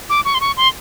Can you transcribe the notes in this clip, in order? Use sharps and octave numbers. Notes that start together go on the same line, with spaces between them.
D6
C#6
C6
C#6
C6